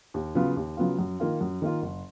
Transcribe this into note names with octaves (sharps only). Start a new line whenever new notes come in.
D#2
C#3 F#3 B3 F4
D#2
C#3 F#3 B3 F4
F#2
D#3 A#3 F4
F#2
D#3 A#3 F4
F#1